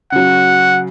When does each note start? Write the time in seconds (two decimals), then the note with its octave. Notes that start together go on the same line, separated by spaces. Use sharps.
0.12 C#3 F#3 F#5